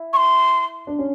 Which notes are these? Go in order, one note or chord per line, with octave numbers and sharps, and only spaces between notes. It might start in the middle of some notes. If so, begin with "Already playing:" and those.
Already playing: E4
C#6
C6
D4
C#4